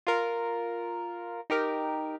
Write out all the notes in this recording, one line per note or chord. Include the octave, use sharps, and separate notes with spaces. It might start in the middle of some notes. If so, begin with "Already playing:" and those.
F4 A#4
D#4 G4 A#4